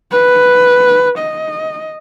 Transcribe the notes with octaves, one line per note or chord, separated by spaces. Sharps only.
B4
D#5